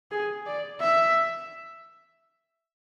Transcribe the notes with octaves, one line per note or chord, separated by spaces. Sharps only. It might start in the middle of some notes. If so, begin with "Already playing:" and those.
G#4
D5
E5